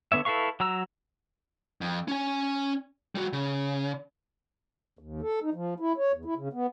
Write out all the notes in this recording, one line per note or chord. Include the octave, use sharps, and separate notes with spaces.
D3 B3 C#5 E5
E4 A4 B4 F5 C#6
F#3 A#5 E6
F2
C#4 G#5
G3 F#4
C#3
D#2
A4
D#4
F3
E4
C#5
E2
E4
C#3
B3